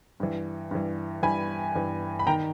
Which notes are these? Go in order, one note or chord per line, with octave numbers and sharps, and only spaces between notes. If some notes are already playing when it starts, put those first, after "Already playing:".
G2 E3
G2 E3
G2 E3 G#5 B5
G2 E3
B5
D#3 G5 A#5